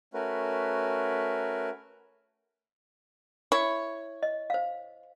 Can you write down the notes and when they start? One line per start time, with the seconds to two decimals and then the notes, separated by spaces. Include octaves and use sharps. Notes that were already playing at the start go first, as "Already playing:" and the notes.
0.14 A3 C#4 F#4 A#4 B4
3.52 E4 C#5
4.23 D#5
4.50 C5 F5